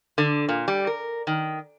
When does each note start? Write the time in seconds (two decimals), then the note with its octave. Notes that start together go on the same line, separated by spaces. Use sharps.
0.18 D3
0.49 A#2
0.68 G3
0.87 A#4
1.27 D#3